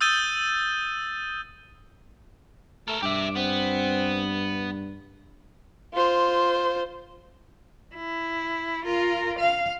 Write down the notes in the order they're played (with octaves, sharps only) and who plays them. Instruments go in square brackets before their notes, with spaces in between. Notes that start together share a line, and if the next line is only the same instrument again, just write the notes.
[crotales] D#6 E6 G6 A6 D#7 G7
[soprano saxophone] A3 [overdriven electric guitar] A4 A#4
[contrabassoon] G2 [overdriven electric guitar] G4 E5 [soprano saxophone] D6
[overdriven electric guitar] B3 [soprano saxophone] C4
[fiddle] F4 C5
[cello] E4
F4 A#4
F5